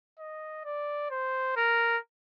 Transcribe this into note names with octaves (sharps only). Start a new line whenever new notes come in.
D#5
D5
C5
A#4